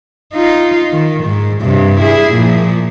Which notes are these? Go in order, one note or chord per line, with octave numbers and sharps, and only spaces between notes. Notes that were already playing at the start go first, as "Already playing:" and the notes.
D#4 F4
D#3
G#2
G2 C3
E4 G#4
A#2 F3